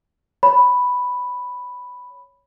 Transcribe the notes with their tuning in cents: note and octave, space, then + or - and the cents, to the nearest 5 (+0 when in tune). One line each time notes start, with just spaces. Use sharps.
C#5 +5 B5 +0